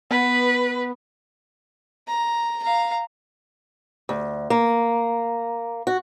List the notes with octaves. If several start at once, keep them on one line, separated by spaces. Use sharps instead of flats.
B3 B4
A#5
F5 A#5
D2
A#3
F#4